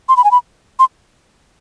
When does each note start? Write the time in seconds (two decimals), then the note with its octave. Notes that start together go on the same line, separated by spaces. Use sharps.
0.09 C6
0.17 B5
0.24 G#5
0.31 B5
0.79 C6